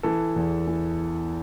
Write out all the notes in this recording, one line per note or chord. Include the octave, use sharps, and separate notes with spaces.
E3 A4
E2
E3